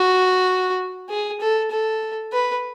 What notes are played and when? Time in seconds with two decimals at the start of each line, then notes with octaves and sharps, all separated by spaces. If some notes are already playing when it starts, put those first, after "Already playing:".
Already playing: F#4
1.09 G#4
1.41 A4
1.71 A4
2.32 B4